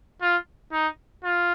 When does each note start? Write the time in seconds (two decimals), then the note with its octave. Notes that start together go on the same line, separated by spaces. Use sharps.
0.22 F4
0.73 D#4
1.24 F4